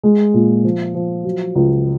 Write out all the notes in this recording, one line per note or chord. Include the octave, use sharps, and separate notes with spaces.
G#3
A#2
F3
F3
F#3
C#2